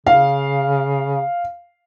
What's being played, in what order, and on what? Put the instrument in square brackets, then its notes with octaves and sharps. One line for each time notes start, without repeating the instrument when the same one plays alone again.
[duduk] C#3 [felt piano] F5